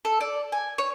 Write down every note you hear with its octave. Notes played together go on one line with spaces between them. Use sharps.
A4
D5
G#5
C#5